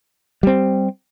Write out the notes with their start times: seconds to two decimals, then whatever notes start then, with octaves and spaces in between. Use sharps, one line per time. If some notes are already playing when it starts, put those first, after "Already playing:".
0.43 G3 C4